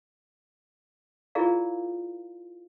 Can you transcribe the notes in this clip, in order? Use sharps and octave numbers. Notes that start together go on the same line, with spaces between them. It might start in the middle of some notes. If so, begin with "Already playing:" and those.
E4 F4 G#4 A#4 D5 F5